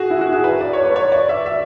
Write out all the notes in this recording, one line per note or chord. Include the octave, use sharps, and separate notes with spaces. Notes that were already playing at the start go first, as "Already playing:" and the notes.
Already playing: F#4 G#4
E4
F#4
G#4
B4
D5
C#5
B4
C#5
D5
E5
E5